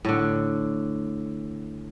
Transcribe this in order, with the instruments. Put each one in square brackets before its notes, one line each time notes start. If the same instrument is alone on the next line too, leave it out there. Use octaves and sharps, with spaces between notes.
[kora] A2 D3